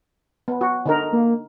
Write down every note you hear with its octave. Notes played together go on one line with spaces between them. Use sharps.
B3
F#4
D3 D#4 A#4
A#3